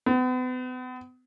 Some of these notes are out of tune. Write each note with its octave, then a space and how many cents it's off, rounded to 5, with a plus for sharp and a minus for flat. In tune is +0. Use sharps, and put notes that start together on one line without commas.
B3 +40